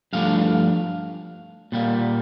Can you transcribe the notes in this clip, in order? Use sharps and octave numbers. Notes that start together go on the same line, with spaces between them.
G2 F3 A3 D4 F5
A#2 G3 A#3